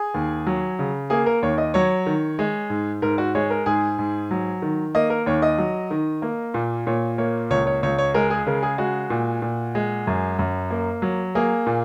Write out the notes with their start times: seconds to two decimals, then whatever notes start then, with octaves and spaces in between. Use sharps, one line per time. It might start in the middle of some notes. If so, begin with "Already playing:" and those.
Already playing: G#4
0.14 D#2
0.47 F#3
0.79 C#3
1.10 A#3 G#4
1.26 A#4
1.42 D#2 C#5
1.58 D#5
1.74 F#3 C#5
2.06 D#3
2.39 G#3
2.70 G#2
3.02 G#2 A#4
3.18 F#4
3.35 G#3 C#5
3.50 A#4
3.66 G#2 G#4
3.99 G#2
4.31 F#3
4.62 D#3
4.95 A#3 D#5
5.10 A#4
5.26 D#2 C#5
5.42 D#5
5.58 F#3
5.91 D#3
6.22 A#3
6.54 A#2
6.87 A#2 C#5
7.18 A#3 C#5
7.50 C#2 C#5
7.67 C#5
7.83 C#2 C#5
7.98 C#5
8.14 G#3 A#4
8.30 G#4
8.46 C#3 A#4
8.63 G#4
8.78 G#3 F#4
9.10 A#2
9.42 A#2
9.75 G#3
10.07 F#2
10.39 F#2
10.70 A#3
11.02 F#3
11.35 A#3 G#4
11.67 A#2